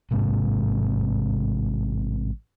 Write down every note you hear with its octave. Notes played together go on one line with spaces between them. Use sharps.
A1 G#2 C3